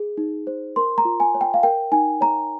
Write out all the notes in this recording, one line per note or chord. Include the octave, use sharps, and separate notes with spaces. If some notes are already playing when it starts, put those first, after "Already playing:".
Already playing: G#4
D#4
C5
A#4 C6
A#5
F4
G#5
C#5
G5
F5
A#4 G5
D#4 G#5
C#5 A#5